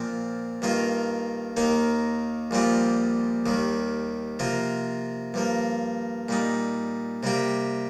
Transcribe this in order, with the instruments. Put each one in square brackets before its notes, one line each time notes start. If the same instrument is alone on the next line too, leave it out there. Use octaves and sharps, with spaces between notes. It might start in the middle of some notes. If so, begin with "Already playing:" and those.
Already playing: [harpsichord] A#2 F3 C4
G2 D#3 A#3 F4
D#2 D#3 A#3 D#4
A#1 A#2 G3 C4 F4
D#2 D#3 G3
C3 F3 A#3 F4
G2 F3 A#3
A#2 G3 D#4
C3 G3 A#3 G4